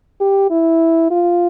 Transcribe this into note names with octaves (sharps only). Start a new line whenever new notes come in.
G4
E4
F4